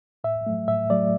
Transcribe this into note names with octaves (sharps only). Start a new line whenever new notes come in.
A2 E5
F#3 A3
A2 E5
F#3 A3 D5